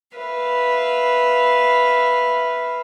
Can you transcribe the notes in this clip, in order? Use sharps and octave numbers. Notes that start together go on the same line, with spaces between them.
B4 E5 F5